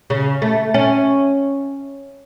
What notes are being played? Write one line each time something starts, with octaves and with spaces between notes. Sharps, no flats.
C#3
A3
C#4